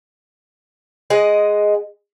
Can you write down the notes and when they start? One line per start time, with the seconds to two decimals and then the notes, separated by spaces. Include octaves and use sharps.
1.10 G#3 D#5 F#5